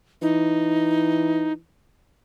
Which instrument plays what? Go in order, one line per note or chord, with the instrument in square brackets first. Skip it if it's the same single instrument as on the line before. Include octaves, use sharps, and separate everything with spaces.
[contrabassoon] E3 [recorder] D#4